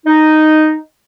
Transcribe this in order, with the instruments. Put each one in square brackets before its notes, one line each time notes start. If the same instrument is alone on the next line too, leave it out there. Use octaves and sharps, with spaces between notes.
[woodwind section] D#4